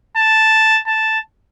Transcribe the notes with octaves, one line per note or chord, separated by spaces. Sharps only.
A5
A5